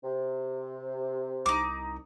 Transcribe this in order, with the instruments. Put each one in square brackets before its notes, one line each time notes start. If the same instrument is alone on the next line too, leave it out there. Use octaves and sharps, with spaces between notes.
[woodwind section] C3
[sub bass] C2 [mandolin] D#4 D6